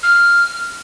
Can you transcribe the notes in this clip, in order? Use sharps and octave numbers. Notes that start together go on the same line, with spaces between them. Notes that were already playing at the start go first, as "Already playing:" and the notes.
F6